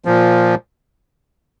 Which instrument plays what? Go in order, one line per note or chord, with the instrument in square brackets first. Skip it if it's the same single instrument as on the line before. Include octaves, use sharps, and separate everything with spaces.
[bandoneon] A#2 F3